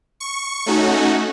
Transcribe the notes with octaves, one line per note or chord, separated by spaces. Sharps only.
C#6
A3 C#4 D#4 F#4